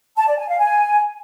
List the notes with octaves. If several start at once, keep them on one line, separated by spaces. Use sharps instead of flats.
A5
D5
G#5
F5
G#5